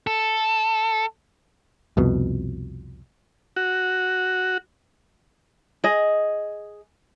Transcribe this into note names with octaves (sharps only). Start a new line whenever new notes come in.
A4
C2 F2 B2
F#4
G#4 D#5